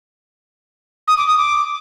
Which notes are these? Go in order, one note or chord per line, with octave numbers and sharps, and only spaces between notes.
D#6
D6
D#6
D6